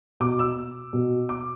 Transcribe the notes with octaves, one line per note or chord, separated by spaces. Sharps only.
B2 D6
E6
B2
D6